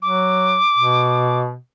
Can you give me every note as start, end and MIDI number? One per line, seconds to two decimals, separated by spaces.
0.02 0.59 54
0.02 1.39 86
0.78 1.56 47